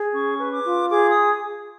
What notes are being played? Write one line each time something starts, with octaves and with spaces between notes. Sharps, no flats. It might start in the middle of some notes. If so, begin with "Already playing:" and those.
Already playing: G#4
C#4 C#6
B4
D6
F4
G#4 D6
D#6